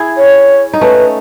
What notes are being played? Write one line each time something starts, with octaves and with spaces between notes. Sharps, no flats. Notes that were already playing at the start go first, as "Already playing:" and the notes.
Already playing: E4 G#4
C#5
D#4
A3 C#4 B4